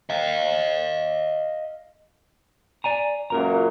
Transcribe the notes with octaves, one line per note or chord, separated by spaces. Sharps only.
D#5 F5
D5 G#5 A#5
C#2 F#2 A#2 A#4 A#5